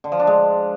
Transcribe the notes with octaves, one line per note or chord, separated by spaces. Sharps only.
D3
F3
D4
G#3